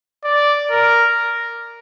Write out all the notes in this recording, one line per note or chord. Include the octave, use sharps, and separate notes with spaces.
D5
A#4